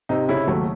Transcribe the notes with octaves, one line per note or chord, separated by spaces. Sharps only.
C3 C4 D#4
C#3 C#4 E4
D#2 F#3 A3